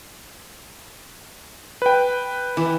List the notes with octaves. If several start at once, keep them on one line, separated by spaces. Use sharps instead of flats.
B4 G5
E3